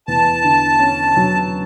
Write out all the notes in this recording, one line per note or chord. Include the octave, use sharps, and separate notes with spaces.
E2 A5
D3
C#4
F#3